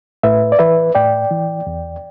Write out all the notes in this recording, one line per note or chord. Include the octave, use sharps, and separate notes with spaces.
A2 B4 E5
D5
E3 B4 E5
A2 D5 G5
E3
E2